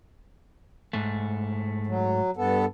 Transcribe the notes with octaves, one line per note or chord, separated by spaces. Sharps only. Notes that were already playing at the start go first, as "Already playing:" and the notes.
G#2 A3
F#3
G2 B3 A4